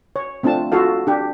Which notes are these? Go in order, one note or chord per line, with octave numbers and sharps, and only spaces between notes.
C#5
A3 C4 D4 F4 A5
F4 F#4 A4 F5
D4 G4